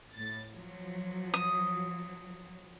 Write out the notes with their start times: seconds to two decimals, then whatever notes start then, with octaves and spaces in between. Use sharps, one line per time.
0.15 A2 A6
0.51 F3 F#3
1.34 D#6